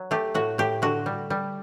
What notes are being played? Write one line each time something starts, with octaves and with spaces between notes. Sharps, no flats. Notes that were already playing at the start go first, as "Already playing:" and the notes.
Already playing: F#3
A3 G4
A2 F#4
A2 G4
D3 F#4
G3
G3